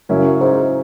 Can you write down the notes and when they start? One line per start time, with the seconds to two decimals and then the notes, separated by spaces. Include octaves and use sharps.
0.09 F#2 C#3 F#3 C#4 E4
0.41 G#2